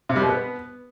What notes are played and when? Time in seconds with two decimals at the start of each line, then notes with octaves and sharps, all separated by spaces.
0.09 C3
0.16 G3
0.22 B2
0.29 B3